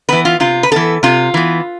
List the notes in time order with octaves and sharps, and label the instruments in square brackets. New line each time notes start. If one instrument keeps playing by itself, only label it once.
[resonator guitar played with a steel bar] E3 B3 B4
F4
C3 F4
B4
E3 B3 A4
C3 F4
E3 B3